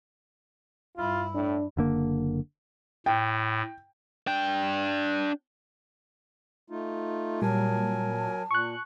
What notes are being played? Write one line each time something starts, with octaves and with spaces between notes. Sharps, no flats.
G2 E4 F4
A2 D4
F#1 D3 A#3
A2 G5
D4 G5
A3 D#4 F4
A#2 F#3 G3 A#4 G#5 A5
A#2 C#6 F#6